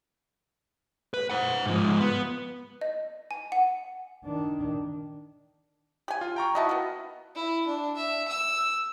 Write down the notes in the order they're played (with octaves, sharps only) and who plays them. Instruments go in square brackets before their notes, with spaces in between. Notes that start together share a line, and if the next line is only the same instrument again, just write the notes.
[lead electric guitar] B4
C5 F#5
G#2 F3
B3
[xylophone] D#5
G#5
F#5
[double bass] D#3 D4
[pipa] G4 G#5
[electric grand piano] F4
G5 A#5 C#6
[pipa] D#4 E4 A5 [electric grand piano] F#4 D#5
[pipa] A#3 B3
[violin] E4
D4
E5
E6